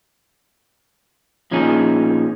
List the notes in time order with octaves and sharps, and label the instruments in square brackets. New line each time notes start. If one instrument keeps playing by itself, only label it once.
[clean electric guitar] A#2 F3 C#4 D#4 G#4